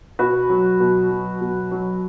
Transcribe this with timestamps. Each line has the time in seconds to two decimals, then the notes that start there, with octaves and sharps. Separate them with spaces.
0.19 B2 F#4 B4
0.49 F#3
0.80 B2
1.10 F#3
1.41 B2
1.71 F#3